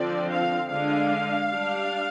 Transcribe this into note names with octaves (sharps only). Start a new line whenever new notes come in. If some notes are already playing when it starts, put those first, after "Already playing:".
Already playing: D3 F3 C4 D5
F5
D3 G#3 D4 F5
G3 D4